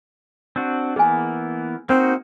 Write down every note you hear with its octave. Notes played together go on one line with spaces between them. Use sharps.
C4 D4 F#4
E3 A#3 B3 G#4 G#5
A#3 C4 D#4 F#4